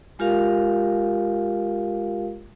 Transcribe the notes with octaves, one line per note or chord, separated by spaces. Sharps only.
G#3 F4 G4 A#4 F5